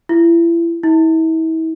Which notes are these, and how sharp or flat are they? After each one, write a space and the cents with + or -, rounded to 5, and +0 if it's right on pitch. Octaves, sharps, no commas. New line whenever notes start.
E4 +35
E4 -40